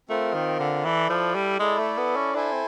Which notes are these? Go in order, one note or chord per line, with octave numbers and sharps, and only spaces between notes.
A3 C4 F4 A#4
D#3
D3
E3 E4 A4 D5
F3
G3
G#3 E4 A4 D5
A3
B3
C#4
D4 E4 A4 C5 E5 G#5
C4